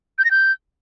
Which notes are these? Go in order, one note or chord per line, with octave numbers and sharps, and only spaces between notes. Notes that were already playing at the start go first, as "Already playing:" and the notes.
G6
A#6
G6